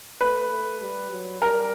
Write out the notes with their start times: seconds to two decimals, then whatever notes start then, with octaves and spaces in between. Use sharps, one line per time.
0.21 A3 B4
0.50 A3
0.81 G3
1.11 F#3
1.41 G3 A#4